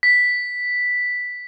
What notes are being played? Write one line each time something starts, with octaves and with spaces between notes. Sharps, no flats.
B6